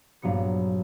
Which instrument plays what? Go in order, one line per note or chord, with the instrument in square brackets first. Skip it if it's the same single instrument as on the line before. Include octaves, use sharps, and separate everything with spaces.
[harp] A#1 G2 F#3 B3 C#7